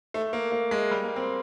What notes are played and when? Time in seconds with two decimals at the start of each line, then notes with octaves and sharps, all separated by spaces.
0.14 A3
0.33 A#3
0.52 A#3
0.71 G#3
0.91 G3
1.04 A#3
1.16 C4